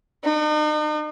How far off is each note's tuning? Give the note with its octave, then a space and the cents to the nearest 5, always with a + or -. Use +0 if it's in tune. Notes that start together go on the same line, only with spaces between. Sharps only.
D#4 -40